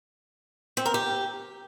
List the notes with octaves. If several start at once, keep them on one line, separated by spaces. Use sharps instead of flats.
C4
A#4
G4